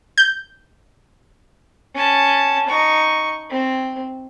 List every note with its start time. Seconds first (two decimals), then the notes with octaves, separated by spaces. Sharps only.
0.18 G6
1.95 C#4 A5
2.68 D#4 C#6
3.50 C4